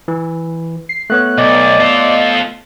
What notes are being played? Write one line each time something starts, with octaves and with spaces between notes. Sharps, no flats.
E3
C7
A3 B3 C#5 F#6
B1 D5 D#5
F4 A4